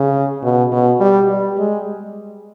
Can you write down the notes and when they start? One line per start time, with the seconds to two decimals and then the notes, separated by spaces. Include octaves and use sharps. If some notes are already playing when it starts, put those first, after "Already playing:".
Already playing: C#3
0.43 B2
0.72 B2
1.00 G3
1.29 G3
1.58 G#3